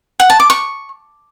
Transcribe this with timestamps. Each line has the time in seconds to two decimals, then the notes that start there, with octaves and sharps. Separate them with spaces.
0.20 F#5
0.30 A5
0.40 D6
0.50 C#6